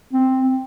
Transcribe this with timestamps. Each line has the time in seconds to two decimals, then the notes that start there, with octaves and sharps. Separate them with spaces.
0.13 C4